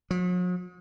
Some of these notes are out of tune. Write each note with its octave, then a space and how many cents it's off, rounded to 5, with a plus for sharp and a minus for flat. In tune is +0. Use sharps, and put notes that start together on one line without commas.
F#3 -45